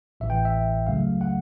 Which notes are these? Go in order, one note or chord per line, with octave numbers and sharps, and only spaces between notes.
A1 A2 E3 E5
G5
E5
C#2 C#3 F#3 A3 F5
F#5